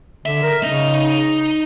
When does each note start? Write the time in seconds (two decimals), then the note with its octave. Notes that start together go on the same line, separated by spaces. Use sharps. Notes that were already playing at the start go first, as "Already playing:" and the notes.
0.26 D3 E5
0.43 A#4
0.63 C#3 D#4 D#5